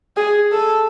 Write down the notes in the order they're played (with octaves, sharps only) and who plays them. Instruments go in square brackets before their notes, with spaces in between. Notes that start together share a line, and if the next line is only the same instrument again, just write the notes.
[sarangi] G#4
A4